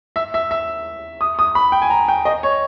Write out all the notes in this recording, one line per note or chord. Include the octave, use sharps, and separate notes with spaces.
E5
E5
E5
D#6
D#6
B5
G5
G#5
A#5
G5
D#5
C#5